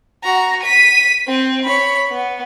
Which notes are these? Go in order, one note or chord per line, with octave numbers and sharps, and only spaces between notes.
F#4 A#5
B6 D#7
C4
C#5 B5
B3